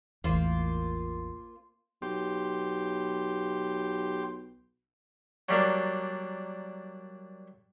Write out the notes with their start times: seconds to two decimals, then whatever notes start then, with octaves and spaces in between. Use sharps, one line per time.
0.24 A1 E2 A#3 F4 C5
2.02 B1 G4 C6
5.49 F#3 G3 A#3 D4